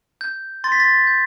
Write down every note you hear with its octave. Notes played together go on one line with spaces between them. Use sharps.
G6
C6 A6
B6
A6
G6